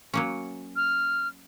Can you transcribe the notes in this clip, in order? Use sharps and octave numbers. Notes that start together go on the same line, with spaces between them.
F#3 A#3 C#4
F6